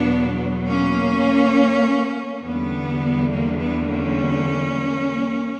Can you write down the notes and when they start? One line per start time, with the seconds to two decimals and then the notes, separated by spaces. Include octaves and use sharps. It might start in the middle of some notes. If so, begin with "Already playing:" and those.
Already playing: E2 B2 F#3 B3 D4
0.67 A#3 C#4
2.42 E2 D3 G3 B3
3.31 A#3
3.60 B3
3.89 A#3 C#4